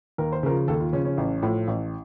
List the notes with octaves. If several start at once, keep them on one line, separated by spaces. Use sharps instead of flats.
D#2 A#4
C5
C#3 F3 A#4
D#2 A4
F4
C#3 F3 C#4
C#4
A1
A2 F3
A1